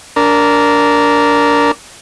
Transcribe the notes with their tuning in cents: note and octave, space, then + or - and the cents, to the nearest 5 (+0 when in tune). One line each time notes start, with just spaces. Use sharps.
D4 -20 A#4 +0